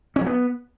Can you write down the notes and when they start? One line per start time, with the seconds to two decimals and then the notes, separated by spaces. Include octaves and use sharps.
0.16 C#4
0.21 F#3
0.26 B3